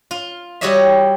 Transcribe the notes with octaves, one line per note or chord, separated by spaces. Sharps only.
F4
G3 F#4 G4 C#5 D#5 E5